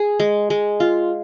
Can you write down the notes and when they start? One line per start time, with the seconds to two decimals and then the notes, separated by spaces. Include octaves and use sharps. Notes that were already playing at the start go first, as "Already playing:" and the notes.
Already playing: G#4
0.20 G#3
0.50 G#3
0.80 F4